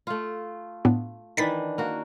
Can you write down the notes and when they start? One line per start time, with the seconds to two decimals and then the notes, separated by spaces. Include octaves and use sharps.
0.07 A3 F4
0.85 A2 B3 D4
1.37 D#3 E3 D4 A6 B6
1.78 A#3 F#4